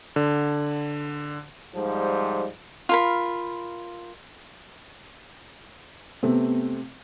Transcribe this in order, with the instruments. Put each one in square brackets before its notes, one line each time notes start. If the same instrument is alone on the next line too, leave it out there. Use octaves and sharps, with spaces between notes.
[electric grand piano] D3
[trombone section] G#2 F3 G3
[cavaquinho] F4 A#4 B5
[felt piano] C3 A3 C4 [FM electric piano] B3